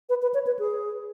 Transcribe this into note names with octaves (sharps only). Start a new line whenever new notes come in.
B4
B4
C#5
B4
G#4